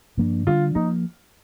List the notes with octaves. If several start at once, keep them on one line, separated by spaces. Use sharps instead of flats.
G2 F3 A#3 D4
D3 G3 D4 F4
F3 A#3 D#4